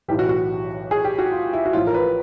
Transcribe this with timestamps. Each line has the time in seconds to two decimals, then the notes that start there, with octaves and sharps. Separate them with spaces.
0.08 B1 A2 E3 G4
0.19 F#4
0.29 F#4
0.91 G#4
1.04 G4
1.19 F#4
1.32 F4
1.53 E4
1.65 F#4
1.73 A1 A2 F3 F4
1.87 A#4
1.94 B4